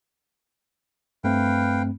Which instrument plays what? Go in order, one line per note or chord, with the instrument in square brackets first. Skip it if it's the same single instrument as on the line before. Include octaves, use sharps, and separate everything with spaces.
[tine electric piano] G2 A3 C4 [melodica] B4 F5 G5